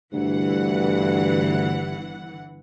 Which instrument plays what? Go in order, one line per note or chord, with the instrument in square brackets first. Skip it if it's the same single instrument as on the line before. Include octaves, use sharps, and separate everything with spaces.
[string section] G1 E3 F#5 [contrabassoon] D2 [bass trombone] G2